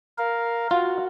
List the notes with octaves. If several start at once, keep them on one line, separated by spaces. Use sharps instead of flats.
A#4 F5
F4 F#4